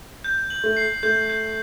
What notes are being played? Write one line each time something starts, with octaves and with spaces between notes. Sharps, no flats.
G6
F#7
A3
C7
A3 G6
G6